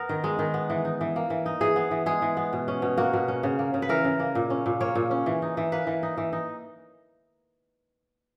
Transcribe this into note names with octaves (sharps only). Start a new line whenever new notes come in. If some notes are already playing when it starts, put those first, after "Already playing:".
Already playing: B3 A#4
D#3
G#3
D#3
B3
E3
D#4
E3
A#3
E3
D#4
E3 G#4
B3
E3
G#3 G#4
E3
B3
B2
C#4
B2
A#3 F#4
B2
C#4
C#3
A#3
C#3
B4
E3 A#4
C#3
A#3
A#2
C#4
A#2
A#3 C#5
A#2
C#4
E3
D#4
E3
A#3 B4
E3
D#4
E3
D#4